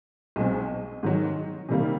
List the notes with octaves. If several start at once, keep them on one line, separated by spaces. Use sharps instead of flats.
B1 B2 G#3 C4
G#2 D#3 F#3
C3 D#3 G3 A#3